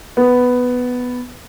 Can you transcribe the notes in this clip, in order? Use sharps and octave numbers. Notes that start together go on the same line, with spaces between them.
B3